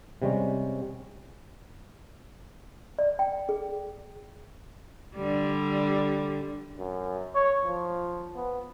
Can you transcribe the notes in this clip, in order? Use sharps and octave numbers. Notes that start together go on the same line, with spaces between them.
C3 G3 G#3 C#4
D5
G5
G#4
D3 G3
F#2
C#5
F3
B3